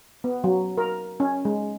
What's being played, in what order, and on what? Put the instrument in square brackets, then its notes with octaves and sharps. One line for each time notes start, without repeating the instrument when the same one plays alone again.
[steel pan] B3
F#3
A#4
C#4
G#3